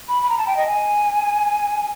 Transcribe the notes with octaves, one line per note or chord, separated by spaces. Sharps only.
B5
B5
A#5
A5
G5
D#5
G#5